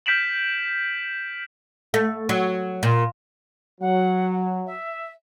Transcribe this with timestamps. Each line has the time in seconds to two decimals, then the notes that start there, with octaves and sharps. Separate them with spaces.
0.06 F6 G6 B6 D7 E7 F#7
1.94 A3
2.29 F#3
2.83 A#2
3.81 F#3 F#5
4.66 E5